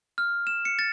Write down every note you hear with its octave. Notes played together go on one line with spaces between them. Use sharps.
F6
E7
C#7
A6